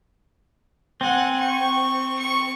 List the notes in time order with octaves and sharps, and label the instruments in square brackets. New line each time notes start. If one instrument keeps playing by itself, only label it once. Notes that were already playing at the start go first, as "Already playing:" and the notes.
[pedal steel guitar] C4 [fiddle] F#5 G#5
[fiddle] C#6
C#6